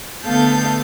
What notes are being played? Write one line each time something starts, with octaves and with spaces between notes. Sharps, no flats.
D3 A3 B3 A4 F5 G6